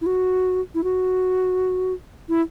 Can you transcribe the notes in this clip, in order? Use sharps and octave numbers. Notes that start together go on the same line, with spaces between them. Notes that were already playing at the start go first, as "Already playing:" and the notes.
E4
F#4
E4
F#4
E4